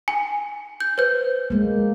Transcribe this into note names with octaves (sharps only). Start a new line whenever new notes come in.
G#5
G6
B4 C5 G6
G#3 A#3